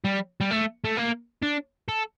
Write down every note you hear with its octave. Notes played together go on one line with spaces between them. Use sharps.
G3
G3
A3
A3
A#3
D4
A4